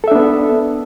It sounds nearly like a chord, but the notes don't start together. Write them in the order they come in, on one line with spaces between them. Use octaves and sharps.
A4 E5 D4 B3